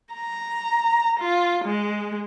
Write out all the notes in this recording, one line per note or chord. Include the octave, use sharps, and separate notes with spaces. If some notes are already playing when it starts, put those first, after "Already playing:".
A#5
F4
G#3